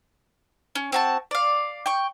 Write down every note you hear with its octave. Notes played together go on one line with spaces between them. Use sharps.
C#4
C4 F#4 A5
D5 F5
G5 C#6